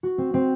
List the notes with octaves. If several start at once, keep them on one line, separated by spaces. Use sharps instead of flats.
F#4
C4
C4